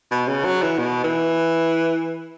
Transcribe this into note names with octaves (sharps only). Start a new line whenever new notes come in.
B2
C#3
F#3
E3
B2
E3